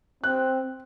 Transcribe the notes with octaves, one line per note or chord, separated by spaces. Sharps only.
C4 F#6